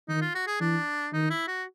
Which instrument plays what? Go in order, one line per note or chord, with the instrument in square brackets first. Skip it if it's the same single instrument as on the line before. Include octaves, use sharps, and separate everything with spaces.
[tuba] D#3 [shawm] D#4
[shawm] F4
F#4
G#4
[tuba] E3 [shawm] D4
[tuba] D#3 [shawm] D#4
[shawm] E4
F#4